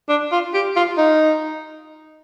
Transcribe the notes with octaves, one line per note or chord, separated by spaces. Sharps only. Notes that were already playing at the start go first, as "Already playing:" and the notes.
D4
F4
G4
F4
D#4